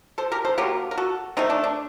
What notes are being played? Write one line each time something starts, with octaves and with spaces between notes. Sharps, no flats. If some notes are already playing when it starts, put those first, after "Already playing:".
A4 C5
G4 A#4
A4 C5
D3 F#3 A#3 G4 A#4
A#4
F#4 A4
D#3 A3 C4 D#4
D4
D4